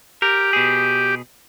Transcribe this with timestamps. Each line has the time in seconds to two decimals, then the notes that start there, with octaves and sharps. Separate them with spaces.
0.22 G4 A#4
0.53 B2 G#4